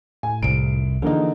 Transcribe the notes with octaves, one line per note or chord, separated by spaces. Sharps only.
A2 G#5
F1 C2 D7
D3 E3 F3 A#3 D#4 G#4